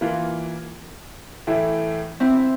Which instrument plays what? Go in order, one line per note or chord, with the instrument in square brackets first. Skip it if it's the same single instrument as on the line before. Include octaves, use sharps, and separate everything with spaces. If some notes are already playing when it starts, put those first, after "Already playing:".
[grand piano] E3 A#3 F4
A2 E3 A3 E4
[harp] C4 E4
E4